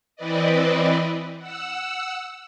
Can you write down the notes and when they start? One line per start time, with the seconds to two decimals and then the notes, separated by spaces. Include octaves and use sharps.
0.16 E3 C4 E4 B4 D5 D#5
1.39 F#5 E6